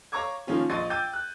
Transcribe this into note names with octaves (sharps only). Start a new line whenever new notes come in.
C#5 F5 A#5 C#6 D6 G#6
D#3 F3 A#3 C#4 F4
A#1 D#5 C6 C#6 A6 D#7
G5 D6 E6 G6 A6 D#7
F#6